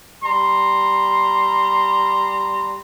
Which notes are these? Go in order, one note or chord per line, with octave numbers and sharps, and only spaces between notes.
G3 A#5 C6